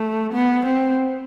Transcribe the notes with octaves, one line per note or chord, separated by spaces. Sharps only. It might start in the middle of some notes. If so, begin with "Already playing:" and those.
Already playing: A3
B3
C4